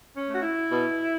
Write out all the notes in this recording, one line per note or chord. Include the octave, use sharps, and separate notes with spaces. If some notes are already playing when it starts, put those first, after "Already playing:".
C#4
A3
F#4
E4
B2